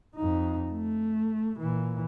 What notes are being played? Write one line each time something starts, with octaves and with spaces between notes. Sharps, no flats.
F2 D#4
A3
A#2 E3